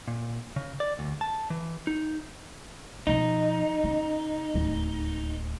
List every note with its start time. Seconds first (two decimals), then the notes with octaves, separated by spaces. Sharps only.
0.08 A#2
0.56 C#3
0.80 D5
0.99 D2
1.21 A5
1.50 E3
1.87 D#4
3.07 B2 F3 D#4
3.84 C#3
4.54 D1 D#2